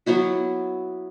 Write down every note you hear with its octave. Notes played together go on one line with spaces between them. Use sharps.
F#3 B3 E4 F#4